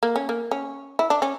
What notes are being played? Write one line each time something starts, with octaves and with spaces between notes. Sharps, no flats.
A#3
C#4
A#3
C#4
E4
D4
C#4